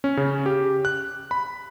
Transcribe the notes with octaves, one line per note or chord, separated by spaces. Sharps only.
C#4
C#3
G4
F#6
B5